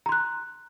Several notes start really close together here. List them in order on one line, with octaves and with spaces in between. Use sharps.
A#5 C6 F#6